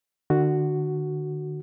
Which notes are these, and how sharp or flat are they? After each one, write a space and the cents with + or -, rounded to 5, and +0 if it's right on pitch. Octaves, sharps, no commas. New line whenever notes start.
D3 +35 F#4 +0